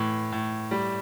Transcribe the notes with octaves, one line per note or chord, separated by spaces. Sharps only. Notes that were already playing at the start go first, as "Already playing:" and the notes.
Already playing: A2 E3
A2
G3